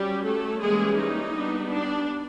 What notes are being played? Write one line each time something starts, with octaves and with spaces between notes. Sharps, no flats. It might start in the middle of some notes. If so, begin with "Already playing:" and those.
Already playing: F#3 G3 C#4 G4
A3 A4
E3 G3 G#3 A#3 C#4 G#4
D#4
G3 B3 D4
D4